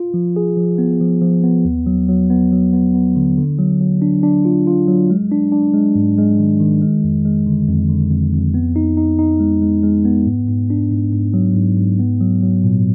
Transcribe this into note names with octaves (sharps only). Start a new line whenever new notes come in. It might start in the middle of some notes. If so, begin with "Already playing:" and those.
Already playing: F4
F3
G#4
F3
B3
F3
F3
B3
D#2
F#3
F#3
B3
F#3
B3
B3
D3
D3
F#3
F#3
D4
D4
F4
F4
F#3
G#3
D4
D4
G#3
G#2
G#3
D#3
D#3
G#3
F2
G#3
D3
F2
D3
F2
F2
B3
D#4
D#4
D#4
G#3
G#3
G#3
B3
G#2
G#2
D4
G#2
G#2
F#3
G#2
G#2
B3
F#3
F#3
A#2